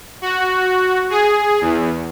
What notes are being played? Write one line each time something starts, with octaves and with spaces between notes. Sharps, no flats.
F#4
G#4
E2